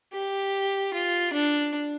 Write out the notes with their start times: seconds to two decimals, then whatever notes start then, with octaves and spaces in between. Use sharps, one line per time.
0.14 G4
0.94 F4
1.33 D4